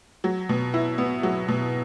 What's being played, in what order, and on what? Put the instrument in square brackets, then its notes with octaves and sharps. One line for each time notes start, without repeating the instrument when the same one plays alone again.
[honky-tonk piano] F#3
B2
E4
B3
F#3
B2